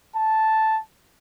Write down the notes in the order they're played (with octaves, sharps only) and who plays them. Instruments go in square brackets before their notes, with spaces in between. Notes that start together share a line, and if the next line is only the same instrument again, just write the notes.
[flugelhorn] A5